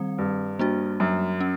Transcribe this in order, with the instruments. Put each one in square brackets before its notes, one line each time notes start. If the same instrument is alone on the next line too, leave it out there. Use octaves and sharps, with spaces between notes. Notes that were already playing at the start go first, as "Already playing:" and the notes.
Already playing: [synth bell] D#3 G3 C4
[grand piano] G2
[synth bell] G3 A#3 D4 F#4
[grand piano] F#2
[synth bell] C#4